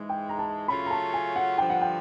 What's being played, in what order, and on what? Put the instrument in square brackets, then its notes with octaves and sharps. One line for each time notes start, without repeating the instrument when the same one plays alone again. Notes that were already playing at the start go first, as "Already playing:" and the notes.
Already playing: [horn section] G#2 E3 G#3
[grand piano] G5
A#5
A5
[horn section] C#3 F#3 A3 C#4 F4 [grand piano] B5
[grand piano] A#5
A5
G#5
F#5
[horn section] G2 D3 F3 [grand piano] G5
[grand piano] F#5
G5